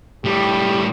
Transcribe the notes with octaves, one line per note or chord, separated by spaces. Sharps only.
A2 G3 G4